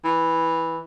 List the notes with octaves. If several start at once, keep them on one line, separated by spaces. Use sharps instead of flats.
E3